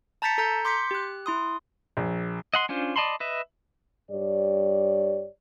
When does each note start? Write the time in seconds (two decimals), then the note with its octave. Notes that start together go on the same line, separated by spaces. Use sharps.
0.22 A5 A#5 G6 A6 B6 C#7
0.38 A4 A#5 G6 C#7
0.65 C6 D6 G6 B6 C#7
0.91 G4 F#6
1.26 E4 C6 D#6
1.97 A#1
2.54 D#5 F#5 C6
2.69 C#4 D4 F4 C5
2.96 D5 D#5 A5 B5 C6
3.20 B4 D#5 E5
4.11 G2 G4 C#5 D5